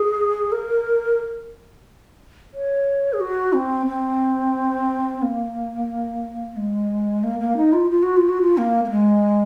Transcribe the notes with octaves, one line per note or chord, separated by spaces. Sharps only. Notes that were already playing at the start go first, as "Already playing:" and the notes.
Already playing: G#4
A#4
C#5
G#4
F#4
C4
C4
A#3
G#3
A#3
A#3
D#4
F4
F4
F#4
F4
F#4
F4
A#3
A#3
G#3